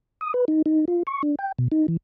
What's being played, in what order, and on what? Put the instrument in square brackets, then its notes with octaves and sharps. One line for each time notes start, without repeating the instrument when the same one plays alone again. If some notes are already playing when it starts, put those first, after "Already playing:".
[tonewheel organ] D#6
B4
D#4
D#4
F4
C#6
D4
G5
B2
D#4
E3